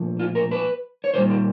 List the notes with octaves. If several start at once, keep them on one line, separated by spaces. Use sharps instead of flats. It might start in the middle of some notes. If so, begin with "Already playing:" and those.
Already playing: A#2 F3 A3
F4
A#4
B4
C#5
A#2 G3 C5
G4